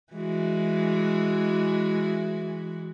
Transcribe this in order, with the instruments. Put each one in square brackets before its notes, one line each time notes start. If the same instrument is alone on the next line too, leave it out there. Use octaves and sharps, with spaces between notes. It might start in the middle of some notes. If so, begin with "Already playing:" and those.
[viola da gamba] E3 G#3 F#4